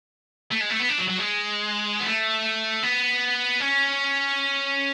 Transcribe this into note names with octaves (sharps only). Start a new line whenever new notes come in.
A3
G#3
A3
B3
D4
F#3
F#3
G#3
B3
A3
B3
C#4